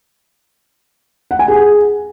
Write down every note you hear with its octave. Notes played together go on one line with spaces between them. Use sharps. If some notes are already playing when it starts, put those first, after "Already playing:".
F#5
G#5
G#4